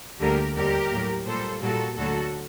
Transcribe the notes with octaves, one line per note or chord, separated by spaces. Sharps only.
D2 D3 G3 A#3 G4 A#4
D#2 D3 G3 A#3 G4 A#4
A2 F#3 A#3
A#2 G3 A#3 A4 C5
A#2 G3 A#3 F#4 A4
D2 D3 F#3 F#4 A4